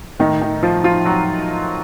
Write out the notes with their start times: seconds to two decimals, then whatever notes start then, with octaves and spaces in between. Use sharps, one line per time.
0.20 A2 D#3 D#4
0.41 D#3 D#4
0.63 F3 F4
0.84 F3 F4
1.05 F#3 F#4